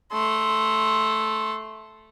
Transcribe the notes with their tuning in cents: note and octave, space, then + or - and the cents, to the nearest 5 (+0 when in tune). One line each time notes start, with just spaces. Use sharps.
A3 -5 C6 +0